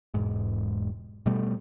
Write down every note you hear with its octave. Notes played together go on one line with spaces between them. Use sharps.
E1 G#2
B2 G3 A3